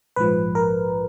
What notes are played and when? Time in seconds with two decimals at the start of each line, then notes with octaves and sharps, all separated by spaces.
0.16 A#1 G#2 F3 B4
0.55 A#4